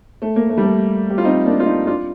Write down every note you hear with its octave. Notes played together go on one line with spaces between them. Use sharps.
A3
A#3
A3
G3
A3
G4
F4
C4 D#4
A#3 D4
F4
C4 D#4
D4 F4